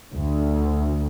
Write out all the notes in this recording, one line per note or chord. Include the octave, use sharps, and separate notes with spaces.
D2